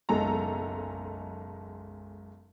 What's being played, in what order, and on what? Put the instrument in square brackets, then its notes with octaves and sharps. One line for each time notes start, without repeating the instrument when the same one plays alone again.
[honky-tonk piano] F#1 B1 G#3 A4 A#5